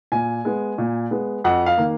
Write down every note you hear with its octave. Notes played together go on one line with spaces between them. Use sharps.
A#2 G#5
G#3 B3
A#2
G#3 B3
F2 F#5
F5
D#3 A#3